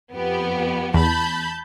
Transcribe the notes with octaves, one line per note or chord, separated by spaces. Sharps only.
F2 B3 G4
E2 A5 B5 G6